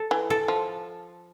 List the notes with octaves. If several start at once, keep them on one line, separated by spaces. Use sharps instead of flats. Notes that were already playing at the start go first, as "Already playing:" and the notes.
Already playing: A4
E3
A4
F3